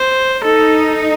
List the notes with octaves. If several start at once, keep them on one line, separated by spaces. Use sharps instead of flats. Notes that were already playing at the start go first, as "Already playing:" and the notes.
Already playing: C5
D#4 A4